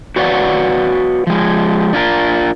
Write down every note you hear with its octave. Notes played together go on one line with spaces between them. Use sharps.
F#4 B4 C#5 D5 F5 F#5
F3 G#3
D4 F4 A#4